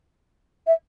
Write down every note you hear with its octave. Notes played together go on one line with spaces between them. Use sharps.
E5